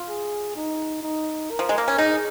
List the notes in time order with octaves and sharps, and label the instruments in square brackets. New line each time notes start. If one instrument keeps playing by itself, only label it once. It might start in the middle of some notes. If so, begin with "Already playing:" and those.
Already playing: [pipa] F4
[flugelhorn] G#4
D#4
D#4
A#4
[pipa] F3
G#3
A#3
C#4
[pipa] D#4 [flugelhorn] G#4